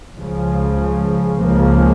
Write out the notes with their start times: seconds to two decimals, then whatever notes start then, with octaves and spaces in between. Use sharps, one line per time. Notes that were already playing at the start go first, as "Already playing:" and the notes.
0.15 C#2 C#3 F3
1.39 C#2 C#3 F3 A#3